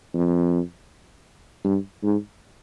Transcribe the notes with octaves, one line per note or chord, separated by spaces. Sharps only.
F2
G2
G#2